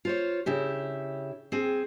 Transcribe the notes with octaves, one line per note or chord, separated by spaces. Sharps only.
F4 C5 C#5
C#3 E4 G4
C4 G#4